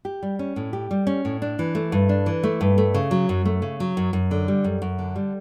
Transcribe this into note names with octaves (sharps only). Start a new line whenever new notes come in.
G4
G3
C#4
A2
G4
G3
C#4
A2
D4
E3
A3
G2
D4
E3
A3
G2
A3
C#3
F#3
F#2
A3
C#3
F#3
F#2
F#2
D3
G3
F#2
F#2
D3
G3